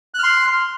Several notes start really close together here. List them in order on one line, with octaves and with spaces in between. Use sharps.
F#6 F6 C6